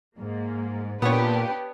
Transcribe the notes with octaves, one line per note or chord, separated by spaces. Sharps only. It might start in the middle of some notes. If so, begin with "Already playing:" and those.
G#2 A#3
A#2 B3 D4 G4 B4 C#5